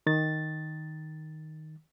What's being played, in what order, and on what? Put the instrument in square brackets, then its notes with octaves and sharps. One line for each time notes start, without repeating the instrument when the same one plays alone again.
[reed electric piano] D#3 A6